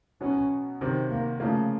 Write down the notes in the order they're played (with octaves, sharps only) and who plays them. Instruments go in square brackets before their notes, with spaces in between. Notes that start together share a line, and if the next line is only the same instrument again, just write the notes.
[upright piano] B2 F#3 B3 [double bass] C#4
[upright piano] C3 D#3 F#3 [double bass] C4
[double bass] A#3
[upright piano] C#3 F3 A#3 [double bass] A3